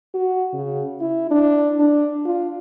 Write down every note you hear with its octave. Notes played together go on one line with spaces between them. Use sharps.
F#4
C#3
E4
D4
D4
F4